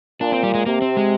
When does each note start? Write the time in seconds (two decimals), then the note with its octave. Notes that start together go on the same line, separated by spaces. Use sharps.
0.21 A#2 D4
0.32 C4
0.43 G3
0.55 G#3
0.66 C3 A#3
0.82 C4
0.97 G#3